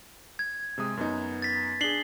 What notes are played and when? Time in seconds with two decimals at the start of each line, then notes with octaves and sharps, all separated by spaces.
0.39 G#6
0.78 C3 G#3 D#6
0.97 F#2 B3 D#4
1.42 A6 B6
1.81 D4 G#4 C7 F#7 G7